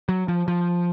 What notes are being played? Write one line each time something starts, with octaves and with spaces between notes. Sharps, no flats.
F#3
F3
F3